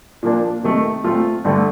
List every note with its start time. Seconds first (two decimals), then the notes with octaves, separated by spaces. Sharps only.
0.23 A#2 F3 A#3 D4
0.63 C3 D#3 A3
1.04 A#2 A3 C4 F4
1.45 G2 D3 A3